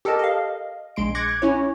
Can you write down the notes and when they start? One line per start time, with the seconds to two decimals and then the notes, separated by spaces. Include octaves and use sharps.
0.05 G4 A4 A#4 D#5 A5
0.19 D#5 F5
0.96 A#1 G#3 C6 D7
1.15 D6 F#6 G#6 A#6 C#7
1.42 C#4 E4 C#5